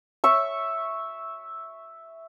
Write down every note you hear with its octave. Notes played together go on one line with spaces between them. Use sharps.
E5 C#6